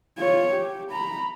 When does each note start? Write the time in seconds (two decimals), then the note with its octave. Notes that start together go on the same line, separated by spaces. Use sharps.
0.19 F4 C#5
0.54 G4
0.92 A#5 B5